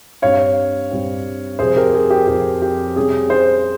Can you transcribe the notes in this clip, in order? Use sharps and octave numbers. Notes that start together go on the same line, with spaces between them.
G2 G3 C4 C#5 F5
G2 G3 C4
F2 C3 F3 G#4 C5
G4 A#4
G#4
G4
F2 C3 F3 G4
G4
C3 G3 C#4 G#4
G#4 C5